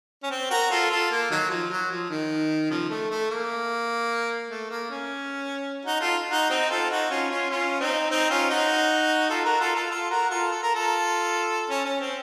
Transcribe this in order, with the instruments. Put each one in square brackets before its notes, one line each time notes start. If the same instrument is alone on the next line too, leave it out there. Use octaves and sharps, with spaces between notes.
[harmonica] C#4
C4
F#4 A#4
F4 A4
F4 A4
A#3
D#3 F#3
F3
F#3
F3
D#3
C#3 F3
A3
A3
A#3
A3
A#3
C#4
D#4 F#4
F4 A4
D#4 F#4
C4 D#4
F4 A4
D#4 F#4
C#4 F4
C#4 F4
C#4 F4
C4 D#4
C4 D#4
C#4 F4
D#4 F#4
F4 A4
F#4 A#4
F4 A4
F4 A4
F4 A4
F#4 A#4
F4 A4
A4
A#4
F4 A4
C#4
C#4
C4